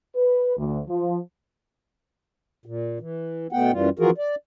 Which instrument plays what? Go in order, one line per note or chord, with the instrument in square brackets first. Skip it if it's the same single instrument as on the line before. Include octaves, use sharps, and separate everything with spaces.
[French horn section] B4
D2
F3
[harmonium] A#2
E3
B2 A3 B3 F#5 G5
F#2 E3 G3 F4
E3 F3 F4 F#4 G#4 A#4
D5